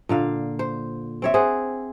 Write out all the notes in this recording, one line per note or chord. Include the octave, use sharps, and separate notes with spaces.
A#2 D3 F5
C5
C4 C#5 E5
G#4 C5 F#5